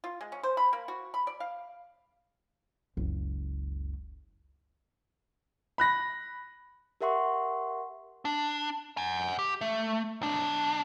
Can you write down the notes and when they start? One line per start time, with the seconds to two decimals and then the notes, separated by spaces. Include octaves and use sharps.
0.04 F4
0.21 G#3
0.32 C#4
0.43 C5
0.57 B5
0.73 A#3
0.88 F#4
1.14 B5
1.27 D5
1.40 F5
2.97 F#1 C#2
5.78 B5 F#6 A#6
7.01 G4 A#4 E5 F#5 C6 C#6
8.25 D4
8.97 F#5 G#5
9.39 G4
9.61 A3
10.22 B1 D4